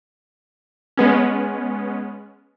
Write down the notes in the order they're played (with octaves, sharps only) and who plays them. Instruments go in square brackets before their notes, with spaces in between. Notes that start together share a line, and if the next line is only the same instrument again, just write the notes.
[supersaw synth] G#3 B3 C#4